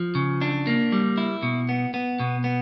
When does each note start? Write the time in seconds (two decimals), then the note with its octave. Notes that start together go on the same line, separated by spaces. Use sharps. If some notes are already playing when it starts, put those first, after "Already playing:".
Already playing: F3
0.15 C#3
0.41 D4
0.67 A#3
0.92 G3
1.18 E4
1.43 B2
1.69 B3
1.94 B3
2.20 B2
2.44 B3